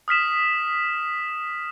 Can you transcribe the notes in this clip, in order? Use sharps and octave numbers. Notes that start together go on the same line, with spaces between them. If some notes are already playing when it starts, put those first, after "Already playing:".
D#6 F6 B6 E7